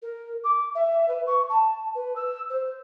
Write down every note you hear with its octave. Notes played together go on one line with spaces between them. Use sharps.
A#4
D6
E5
B4
C#6
A5
B4
E6
C5